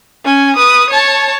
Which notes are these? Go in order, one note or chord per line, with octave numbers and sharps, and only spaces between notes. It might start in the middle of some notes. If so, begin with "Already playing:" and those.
C#4 G#5
B4 D#6
C#5 A5